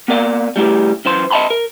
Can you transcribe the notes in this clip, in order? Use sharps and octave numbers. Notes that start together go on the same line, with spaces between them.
A#3 B3 A#4 D5 F5
G3 A3 E4 G4
F#2 E3 C5 C6
D#5 E5 G5 A5 B5 C6
A#4